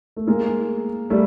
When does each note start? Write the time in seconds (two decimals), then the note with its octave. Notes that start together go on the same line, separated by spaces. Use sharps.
0.17 A3
0.27 G#3 A#3
1.10 G3 A3